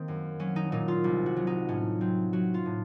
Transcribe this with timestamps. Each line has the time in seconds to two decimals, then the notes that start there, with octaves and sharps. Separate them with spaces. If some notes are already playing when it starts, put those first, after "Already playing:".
Already playing: D#3 A#3 C4
0.08 F#2
0.40 F#3 C#4
0.56 D#4
0.72 A#2 D#4
0.88 F4
1.04 C2
1.26 F#4
1.36 F#3
1.47 D#4
1.69 A2 C#4
2.01 F#3 C4
2.33 F#3 F#4
2.54 F4
2.66 A2